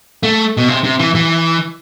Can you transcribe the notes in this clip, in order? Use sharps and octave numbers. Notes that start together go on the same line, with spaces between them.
A3
B2
C3
C3
E3
E3